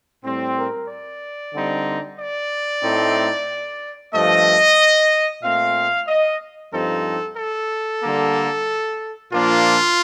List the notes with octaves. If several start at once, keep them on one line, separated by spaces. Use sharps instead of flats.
A2 G3 C4
A#4
D5
D3 G3 C4 D#4
D5
A2 A3 C4 D#4
G2 F3 A3 D#5
A#2 A3 C4 F5
D#5
G2 F3 C4 D#4 A4
A4
D3 G3 A#3
A#2 F3 A#3 D4 F4